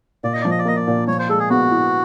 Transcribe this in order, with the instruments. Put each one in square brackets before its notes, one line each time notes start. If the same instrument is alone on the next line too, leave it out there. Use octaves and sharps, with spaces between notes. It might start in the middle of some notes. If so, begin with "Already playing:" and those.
[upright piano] A#2 [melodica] D5
[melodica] D#5
[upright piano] F3 [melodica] D5
[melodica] D#5
D5
[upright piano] A#3 [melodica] D#5
[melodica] D5
[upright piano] A#2
[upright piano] F3 [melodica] C#5
[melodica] C5
[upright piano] G#3 [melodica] A4
[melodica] G#4
[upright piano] B3 [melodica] F#4
[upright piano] E4